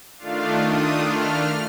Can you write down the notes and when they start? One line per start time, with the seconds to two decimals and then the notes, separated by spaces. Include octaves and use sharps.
0.17 D#3 A3 D4 F4 F5
0.59 D#6
0.99 F6